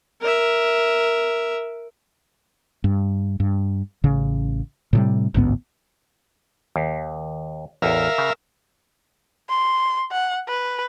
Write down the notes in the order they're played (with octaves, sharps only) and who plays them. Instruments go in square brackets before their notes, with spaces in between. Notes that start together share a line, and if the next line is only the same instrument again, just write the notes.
[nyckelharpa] A#4 E5
[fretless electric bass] G2
G2
A1 C#3
A2 C3 G3
A1 D2 G#2 B3
[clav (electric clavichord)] D#2
[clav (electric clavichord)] A1 E2 [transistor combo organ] A#4 E5 F5
[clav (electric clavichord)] C#3
[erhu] C6
F#5
B4